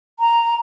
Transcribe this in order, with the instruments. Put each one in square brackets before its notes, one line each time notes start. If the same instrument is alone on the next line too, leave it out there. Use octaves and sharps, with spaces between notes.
[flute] A#5